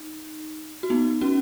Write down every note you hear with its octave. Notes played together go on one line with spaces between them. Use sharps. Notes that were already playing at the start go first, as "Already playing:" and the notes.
Already playing: D#4
F#4
B3 D#4
C#4 F#4